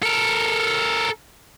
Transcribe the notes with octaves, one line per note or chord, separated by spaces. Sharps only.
A4 A#4